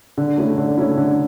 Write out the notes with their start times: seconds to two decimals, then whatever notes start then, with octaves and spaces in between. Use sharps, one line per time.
0.18 D3
0.38 A3 C#4 E4
0.58 D3
0.78 A3 C#4 E4
0.98 D3